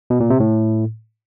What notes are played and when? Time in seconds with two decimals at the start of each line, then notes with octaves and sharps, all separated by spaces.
0.10 B2
0.20 A#2
0.30 C3
0.40 A2